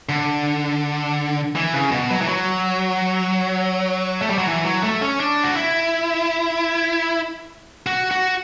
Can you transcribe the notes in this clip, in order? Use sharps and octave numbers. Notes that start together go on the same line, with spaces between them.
D3
E3
C#3
B2
F#3
E3
F#3
A3
G3
F#3
E3
F#3
A3
C#4
D4
F#4
E4
F#4
F#4